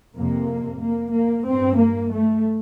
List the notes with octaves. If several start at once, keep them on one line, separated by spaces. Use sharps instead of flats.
F2 C3 A#3
A#3
A#3
G2 C4
A#3
A3